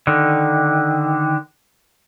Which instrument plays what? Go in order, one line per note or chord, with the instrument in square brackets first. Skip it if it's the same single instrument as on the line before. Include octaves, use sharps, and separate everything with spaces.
[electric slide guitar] D3 D#3